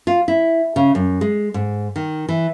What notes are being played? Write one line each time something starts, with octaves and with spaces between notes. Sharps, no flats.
F4
E4
C#3
F#2
G#3
G#2
D#3
E3